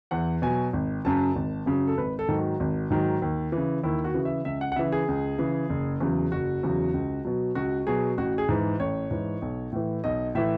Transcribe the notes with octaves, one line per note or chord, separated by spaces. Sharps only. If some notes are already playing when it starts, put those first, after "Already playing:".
E2 F#5
B2 F#3 G#5
G#1
F#2 C#3 F#3 A5
G#1
F#2 C#3 F#3
A4
G#1 B4
A4
G#2 D#3 F#3
F#4
G#1
G#2 D#3 F#3
D#2
E3
C#3
D#2 E4
F#4
C#3 E3
E5
C#2 E5
F#5
F#5
C#3 E3 E5
G#4
C#2
C#3 E3
F#1
E2 C#3 F#3
F#1 F#4
E2 C#3 F#3
C#2
B2 F#3
C#2 F#4
B2 F#3 G#4
A1 F#4
G#4
G#2 E3
A1 C#5
G#2 E3
B1
A2 E3
B1 D#5
A2 E3 E5